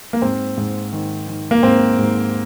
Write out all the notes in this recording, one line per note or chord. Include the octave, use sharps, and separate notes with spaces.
A#3
G#2 C4
G#2
D#3
D#3
A#3
G#2 C4
G#2